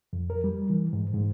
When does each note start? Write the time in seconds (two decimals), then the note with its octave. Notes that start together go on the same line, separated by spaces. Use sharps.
0.13 F2
0.30 A#4
0.44 G3
0.70 E3
0.93 G#2
1.14 G#2